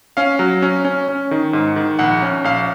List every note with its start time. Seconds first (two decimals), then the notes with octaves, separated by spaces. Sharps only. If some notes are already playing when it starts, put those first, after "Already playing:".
0.17 C#4 F5
0.39 F#3
0.62 C#4
0.85 C#4
1.08 C#4
1.31 D#3
1.53 G#2
1.76 D#3
1.99 A#1 F#5
2.22 C#4
2.44 A#1 F5